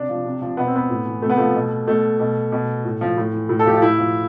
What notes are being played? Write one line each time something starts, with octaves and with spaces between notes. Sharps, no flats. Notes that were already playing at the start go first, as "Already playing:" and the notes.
Already playing: C3 D4
F3
C3
F3
B2 B3
C4
B3
A2
E3
C3 A3
B3
F3 A3
B2
B2 A3
B2
B2
A2
F3
A2
E3
A2
A4
F3 G4
F4
A2 E4
F3